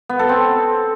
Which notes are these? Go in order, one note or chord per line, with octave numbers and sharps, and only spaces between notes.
B3
A4
C4